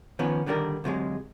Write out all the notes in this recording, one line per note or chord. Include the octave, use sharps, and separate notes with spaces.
D#3 F3 B3 C#4
D3 D#3 G3 D4 F#4 A#4
D2 C3 F#3 G#3